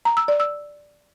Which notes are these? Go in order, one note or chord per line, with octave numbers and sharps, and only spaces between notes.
A#5
E6
D5
E6